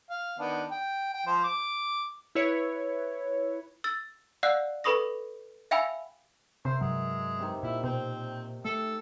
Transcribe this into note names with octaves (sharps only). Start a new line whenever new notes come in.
F5
D#3 B3 D4
G5
G5
F3 C5
D6
E4 B4 C#5
E6 A6
D5 F5 F#5 E6 F#6 C7
A4 B4 B5 C#6 D#6 A#6
E5 F5 G5 G#5 B5 E6
C3 A#4 C5 E5
G2 F#3 G#3
C3 D#3
A#2 E4
B2 C4
A3 A4